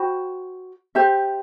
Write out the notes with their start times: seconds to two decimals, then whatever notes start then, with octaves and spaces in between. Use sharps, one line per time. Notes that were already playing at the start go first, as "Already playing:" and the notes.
Already playing: F#4 C5 G5 B5
0.95 G4 C5 E5